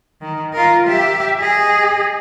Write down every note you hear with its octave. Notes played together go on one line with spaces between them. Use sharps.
D#3
F4 A#4
G4 E5
G#4 D#5